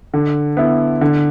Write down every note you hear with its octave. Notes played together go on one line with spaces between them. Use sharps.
D3
B3 E4
D3